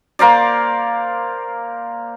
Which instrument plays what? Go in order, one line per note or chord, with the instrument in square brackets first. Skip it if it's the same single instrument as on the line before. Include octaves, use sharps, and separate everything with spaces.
[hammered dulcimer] A#3 A#4 C5 D5